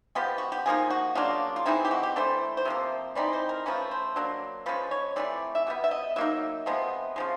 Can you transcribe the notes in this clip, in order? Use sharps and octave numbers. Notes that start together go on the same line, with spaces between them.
F3 G#3 B3 G4
F#4
G4
D3 F3 A#3 D#4 G#4
F#4
C#3 F#3 A#3 D4 F4
F4
E3 G#3 C4 D#4 E4
G4
F#4
G4
E3 A3 D4 C5
C5
C3 F3 A#3
E3 G3 C4 D#4 D5
C5
A#4
F3 A3 C#4 B4
C5
F#3 A#3 D4
F3 G#3 C#4 B4
C#5
C3 E3 A3 D5
E5
B2 G3 B3
E5
D#5
F#3 A#3 D#4 E5
C3 F3 G#3 B3
C#3 F3 G#3